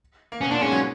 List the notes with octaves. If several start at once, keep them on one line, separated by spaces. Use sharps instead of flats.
A#3
B2 B3 C#4
A#2 A#3 D4
G#2 G#3 C#4
F#3